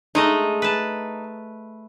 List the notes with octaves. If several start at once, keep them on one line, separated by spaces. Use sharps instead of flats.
G#3 A3 D#4 D#5
B4 A5